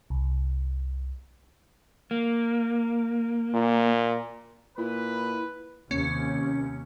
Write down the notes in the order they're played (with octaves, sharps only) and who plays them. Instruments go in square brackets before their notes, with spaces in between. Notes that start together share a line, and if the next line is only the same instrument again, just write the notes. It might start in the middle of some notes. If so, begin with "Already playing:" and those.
[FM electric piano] C2
[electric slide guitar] A#3
[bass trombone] A#2
[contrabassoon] A#2 [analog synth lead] E4 [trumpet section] B4
[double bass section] D#2 C3 [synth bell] C#4